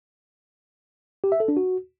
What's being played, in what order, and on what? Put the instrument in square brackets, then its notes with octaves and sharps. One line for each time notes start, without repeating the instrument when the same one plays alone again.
[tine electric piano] G4
E5
A4
D4
F#4